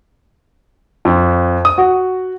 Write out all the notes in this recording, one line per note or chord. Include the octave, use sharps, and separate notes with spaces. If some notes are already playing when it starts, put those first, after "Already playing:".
F2
D#6
F#4